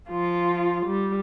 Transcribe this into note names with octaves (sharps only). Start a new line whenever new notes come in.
F3 F4
G3